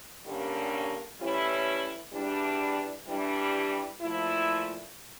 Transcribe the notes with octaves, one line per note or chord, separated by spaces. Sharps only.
G2 D3 G3 A#3 C#4
A2 E3 G3 C#4 E4
E2 E3 G3 D4
E3 G3 D4
A#2 F3 A3 E4